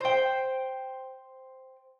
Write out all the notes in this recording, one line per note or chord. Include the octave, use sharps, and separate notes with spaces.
C5 G5